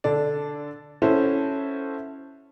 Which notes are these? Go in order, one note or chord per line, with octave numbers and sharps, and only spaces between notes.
D3 D4 A4 D5
C#4 E4 F#4 A4 C5